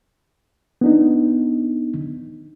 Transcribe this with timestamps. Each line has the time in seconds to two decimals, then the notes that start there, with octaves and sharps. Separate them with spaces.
0.81 B3 D4 D#4